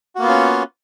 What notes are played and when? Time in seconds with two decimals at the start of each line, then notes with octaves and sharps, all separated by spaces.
0.15 F#4
0.19 A#3
0.22 B3
0.25 F4
0.28 C#4